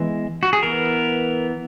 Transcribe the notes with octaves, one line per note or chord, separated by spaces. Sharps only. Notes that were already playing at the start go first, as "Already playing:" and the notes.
Already playing: E3 G#3 B3
F#4
G#4
E3 B3 A#4